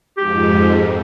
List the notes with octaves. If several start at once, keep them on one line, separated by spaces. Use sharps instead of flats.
F2 G#2 G4